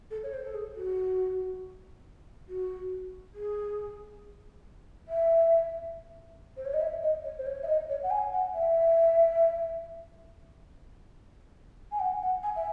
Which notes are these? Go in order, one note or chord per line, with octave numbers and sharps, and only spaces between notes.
A4
C#5
C5
A4
G#4
F#4
F#4
G#4
E5
C5
C#5
D#5
E5
D#5
C#5
C5
C#5
E5
D#5
C#5
F#5
G#5
F#5
E5
G#5
F#5
F#5
G#5
E5